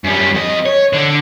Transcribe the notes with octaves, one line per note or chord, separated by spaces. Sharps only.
F#2 G3
F2 D#5
C#5
D3 D4